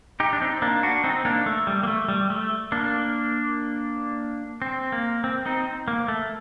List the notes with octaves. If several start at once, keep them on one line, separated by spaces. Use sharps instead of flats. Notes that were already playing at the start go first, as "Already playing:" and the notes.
D#4 G4
D4
C4 D#4
A#3 D4
D4 F#4
C4 D#4
A#3 D4
A3
G3
A#3
A3
G3
A3
A#3 D4
C4
A#3
C4
C4 D#4
A#3
A3